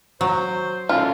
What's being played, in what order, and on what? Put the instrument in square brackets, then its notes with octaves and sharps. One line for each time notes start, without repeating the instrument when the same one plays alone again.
[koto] F#3 [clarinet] C5
[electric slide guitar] C#4 A4 A5 [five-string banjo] F4